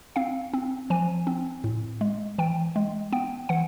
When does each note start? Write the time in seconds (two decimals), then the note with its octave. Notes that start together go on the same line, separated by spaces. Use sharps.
0.16 C4 F5
0.53 C4
0.90 F3 G#5
1.27 C4
1.64 A2
2.01 G#3
2.38 E3 G5
2.76 G#3
3.12 B3 G5
3.49 E3 F#5